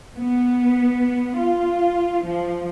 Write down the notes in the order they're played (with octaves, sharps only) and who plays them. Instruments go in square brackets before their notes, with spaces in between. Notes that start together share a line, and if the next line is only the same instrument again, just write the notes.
[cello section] B3
F4
F3